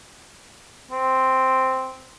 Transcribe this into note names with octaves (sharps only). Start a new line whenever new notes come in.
C4